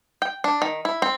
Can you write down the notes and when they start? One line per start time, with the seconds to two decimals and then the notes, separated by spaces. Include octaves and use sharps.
0.22 G5
0.44 D4
0.62 D#3
0.85 E4
1.02 C4